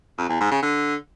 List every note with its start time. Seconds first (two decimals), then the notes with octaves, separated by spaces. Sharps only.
0.18 F2
0.29 E2
0.40 G#2
0.51 C#3
0.63 D3